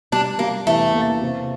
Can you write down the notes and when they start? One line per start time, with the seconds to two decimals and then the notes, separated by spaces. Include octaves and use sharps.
0.12 G3 D4
0.39 G3 A#3
0.67 E2 A3
0.94 A#3
1.21 C3